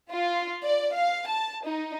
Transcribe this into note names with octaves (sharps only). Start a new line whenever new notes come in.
F4
D5
F5
A5
D#4